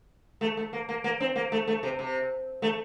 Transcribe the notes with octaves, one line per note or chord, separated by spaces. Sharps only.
A3
A3
A#3
A#3
A#3
C4
A#3
A3
A3
C3
C3
A3